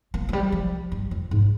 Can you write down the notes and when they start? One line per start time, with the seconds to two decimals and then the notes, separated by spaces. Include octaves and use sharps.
0.14 A#3
0.29 F3
0.33 G3
0.52 F3
0.92 G2
1.11 F2
1.31 G#2